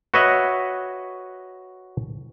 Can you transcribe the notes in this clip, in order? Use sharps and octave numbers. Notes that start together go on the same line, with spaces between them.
F#4 B4 C#5 D#5 E5 F#5